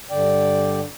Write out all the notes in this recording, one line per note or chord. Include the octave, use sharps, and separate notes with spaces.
G2 D3 D5 G5